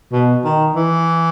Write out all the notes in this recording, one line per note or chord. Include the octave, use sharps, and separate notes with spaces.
B2
D#3
E3